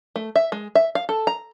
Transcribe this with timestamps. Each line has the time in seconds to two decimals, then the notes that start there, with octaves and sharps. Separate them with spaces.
0.16 A3
0.36 E5
0.52 G#3
0.75 E5
0.95 F5
1.09 A4
1.27 A#5